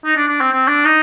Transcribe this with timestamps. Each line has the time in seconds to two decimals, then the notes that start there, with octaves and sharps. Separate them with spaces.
0.05 D#4
0.16 D4
0.28 D4
0.41 C4
0.52 C4
0.68 D4
0.85 D#4